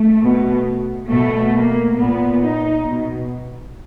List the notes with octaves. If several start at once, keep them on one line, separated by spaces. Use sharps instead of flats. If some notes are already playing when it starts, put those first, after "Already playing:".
Already playing: A3
B2
B2 A3
A#3
A#2 B3
D#4
B2